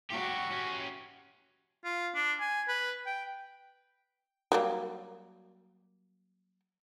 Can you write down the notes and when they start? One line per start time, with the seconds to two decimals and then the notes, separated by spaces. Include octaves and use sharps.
0.11 F#3 F#4 G4
0.51 C#4 G4
1.84 F4
2.15 D4
2.41 G#5
2.68 B4
3.06 G5
4.52 F#3 G3 A#3